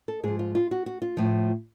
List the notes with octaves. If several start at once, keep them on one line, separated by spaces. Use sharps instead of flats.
A4
G#2 F3 G#4
F4
F4
F#4
F#4
F4
A2 F3